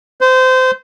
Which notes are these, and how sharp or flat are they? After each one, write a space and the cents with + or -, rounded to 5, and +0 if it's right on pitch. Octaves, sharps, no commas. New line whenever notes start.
C5 -25